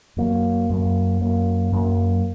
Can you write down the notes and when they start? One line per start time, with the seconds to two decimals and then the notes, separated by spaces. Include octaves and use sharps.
0.17 F#2 F#3 A#3
0.69 F#2 F#3 A#3
1.20 F#2 F#3 A#3
1.72 F#2 F#3 A#3